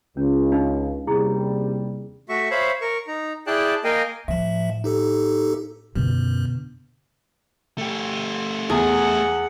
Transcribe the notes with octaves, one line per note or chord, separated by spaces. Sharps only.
C#2 C#4
D4 D#4 F5
D#2 C3 G3 E4 G#4
A3 F#4 E5 C#6
C5 C#5 E5 F5 B5
A#4 C#6
D#4 A#5
E4 G#4 D5 G5 A5 F#6
A#3 A#4 D#5 F5 G5 G#5
A2 F3 E5
D#4 G4 A4
F#2 B2 D3
A3 G4
E2 G#4 F#5